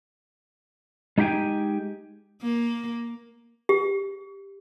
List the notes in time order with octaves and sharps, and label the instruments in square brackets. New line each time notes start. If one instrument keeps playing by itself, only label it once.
[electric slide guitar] G#3 D#4 G4 E5 G5 G#5
[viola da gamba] A#3
[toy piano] G4